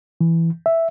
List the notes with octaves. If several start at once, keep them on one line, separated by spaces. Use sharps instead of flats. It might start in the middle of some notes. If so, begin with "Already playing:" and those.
E3
E5